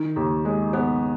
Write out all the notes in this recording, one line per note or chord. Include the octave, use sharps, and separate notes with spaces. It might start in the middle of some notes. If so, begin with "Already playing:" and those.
Already playing: D#3
D#2
G#3
B3